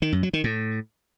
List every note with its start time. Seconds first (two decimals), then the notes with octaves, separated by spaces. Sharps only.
0.02 D#3
0.12 F#2
0.23 F#3
0.33 D#3
0.44 A2